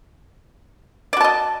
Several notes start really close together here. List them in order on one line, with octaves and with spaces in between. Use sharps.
D5 F#4 A5 D#5